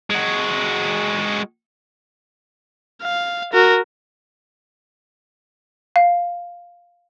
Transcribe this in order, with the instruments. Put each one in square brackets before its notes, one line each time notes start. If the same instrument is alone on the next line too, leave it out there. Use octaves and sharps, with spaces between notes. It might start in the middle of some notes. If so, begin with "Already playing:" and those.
[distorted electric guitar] G#3 F#4
[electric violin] F5
F#4 A#4
[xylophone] F5